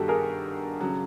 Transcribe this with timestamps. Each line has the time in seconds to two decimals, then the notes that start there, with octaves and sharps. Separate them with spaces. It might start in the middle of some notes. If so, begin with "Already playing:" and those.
Already playing: G2 D#3 G3 F#4 G4 A4
0.08 G#4 A#4
0.81 C#3 F#3